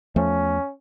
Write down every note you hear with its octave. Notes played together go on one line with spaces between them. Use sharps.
E2 F3 A3 C#4